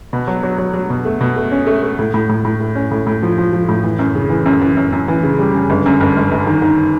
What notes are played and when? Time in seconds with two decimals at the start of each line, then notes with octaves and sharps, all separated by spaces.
0.13 B2
0.27 F#3
0.43 F#3
0.58 F#3
0.74 F#3
0.90 B2
1.05 A3
1.21 B2
1.36 A3
1.52 C#4
1.67 A3
1.83 A3
1.99 A2
2.14 A2
2.29 A2
2.45 A2
2.60 A3
2.75 C#4
2.91 A2
3.07 A2
3.23 F3
3.38 F3
3.53 F3
3.69 A2
3.84 E3
3.99 F#2
4.15 C#3
4.30 E3
4.46 F#2
4.61 E3
4.77 F#2
4.92 F#2
5.08 E3
5.23 C#3
5.39 G3
5.54 C#3
5.70 G1
5.86 F#2
6.01 G1
6.16 G1
6.32 G1
6.47 D#3
6.62 D#3